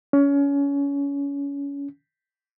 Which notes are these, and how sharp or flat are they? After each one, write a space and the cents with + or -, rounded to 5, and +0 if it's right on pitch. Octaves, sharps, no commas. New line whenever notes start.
C#4 +25